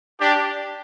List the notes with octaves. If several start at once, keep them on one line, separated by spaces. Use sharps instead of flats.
D4 G4